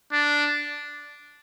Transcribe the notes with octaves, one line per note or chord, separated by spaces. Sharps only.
D4